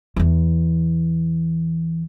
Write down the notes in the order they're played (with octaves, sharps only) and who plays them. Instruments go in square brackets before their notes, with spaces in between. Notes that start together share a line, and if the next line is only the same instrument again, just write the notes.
[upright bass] E2 E3